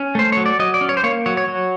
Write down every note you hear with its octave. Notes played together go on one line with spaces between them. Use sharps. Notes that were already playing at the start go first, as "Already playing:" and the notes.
Already playing: C#4
A3 C5
F#3 C#5
D5
F#3 D#5
D5
C#4
C#5
C5
A#3 C#5
F#3 C#5
C#5
F#3